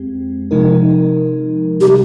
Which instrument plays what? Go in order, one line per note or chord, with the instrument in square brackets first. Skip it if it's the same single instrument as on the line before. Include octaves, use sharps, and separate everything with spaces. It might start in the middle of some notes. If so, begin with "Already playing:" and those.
Already playing: [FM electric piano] F2 G#3 C4 G4
C3 F3 G#3 D#4 A#4
[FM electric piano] C3 G3 [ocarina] G4